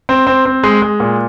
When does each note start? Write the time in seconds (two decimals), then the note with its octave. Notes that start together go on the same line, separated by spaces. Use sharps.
0.09 C4
0.27 C4
0.45 C4
0.63 G#3
0.82 G#3
1.00 A#2